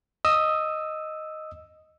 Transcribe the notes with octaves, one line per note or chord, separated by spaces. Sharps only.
D#5 D#6 E6